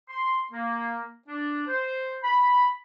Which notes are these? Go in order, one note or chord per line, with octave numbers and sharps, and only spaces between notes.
C6
A#3
D4
C5
B5